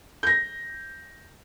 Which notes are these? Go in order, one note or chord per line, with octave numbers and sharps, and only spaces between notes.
G6 A#6